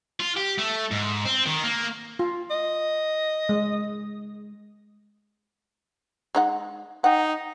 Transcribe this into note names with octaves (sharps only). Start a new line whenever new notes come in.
F4
G4
A3
G#2
C4
D#3
A#3
F4
D#5
G#3
G#3 D#4 F#5
D#4 F#5 G5